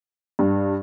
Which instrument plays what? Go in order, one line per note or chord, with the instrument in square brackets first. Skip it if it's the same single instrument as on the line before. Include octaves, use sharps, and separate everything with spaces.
[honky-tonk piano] G2